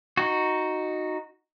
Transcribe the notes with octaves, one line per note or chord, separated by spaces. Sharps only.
D#4 F#4